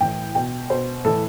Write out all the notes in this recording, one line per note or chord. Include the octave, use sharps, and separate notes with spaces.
A2 E3 G5
B2 G5
B2 C5
A2 E3 A4